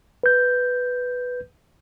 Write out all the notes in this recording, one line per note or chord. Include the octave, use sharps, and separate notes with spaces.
B4 G6